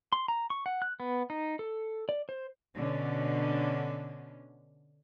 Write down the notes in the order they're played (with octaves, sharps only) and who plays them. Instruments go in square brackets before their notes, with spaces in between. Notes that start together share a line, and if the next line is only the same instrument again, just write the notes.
[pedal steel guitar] C6
A#5
C#6
F#5
F#6
B3
D#4
A4
D5
C5
[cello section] B2 D3 C#4